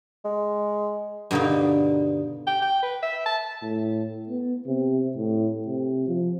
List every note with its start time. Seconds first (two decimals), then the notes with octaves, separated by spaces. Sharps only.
0.25 G#3
1.31 G2 B2 D3 A#3 D#4
2.47 G5
2.62 G5
2.83 B4
3.02 E5
3.26 A5
3.62 A2
4.29 B3
4.67 C3
5.17 A2
5.67 C3
6.08 F3